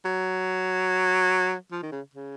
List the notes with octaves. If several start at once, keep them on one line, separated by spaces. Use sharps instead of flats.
F#3
F3
D#3
C#3
C#3